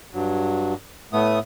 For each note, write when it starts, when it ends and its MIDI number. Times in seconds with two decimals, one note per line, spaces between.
0.13 0.74 43
0.13 0.74 54
1.13 1.39 45
1.13 1.39 57
1.13 1.39 59
1.13 1.39 87